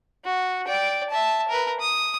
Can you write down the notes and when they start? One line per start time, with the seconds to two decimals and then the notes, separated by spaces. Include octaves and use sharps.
0.25 F#4
0.67 D5 G5
1.10 E5 A5
1.48 A#4 B4
1.80 D#6